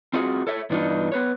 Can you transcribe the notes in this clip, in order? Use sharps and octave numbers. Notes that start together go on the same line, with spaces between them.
C4 F4 F#4 G#4
A4 C#5 E5
G2 E3 B3 D4 D#4 F4
B3 B4 C#5